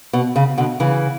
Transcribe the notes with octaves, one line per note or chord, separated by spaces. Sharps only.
B2
C#3
B2 D3
C#3 E3